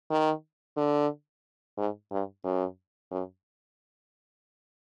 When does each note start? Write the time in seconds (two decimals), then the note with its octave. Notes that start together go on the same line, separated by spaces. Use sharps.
0.10 D#3
0.77 D3
1.78 G#2
2.11 G2
2.44 F#2
3.11 F#2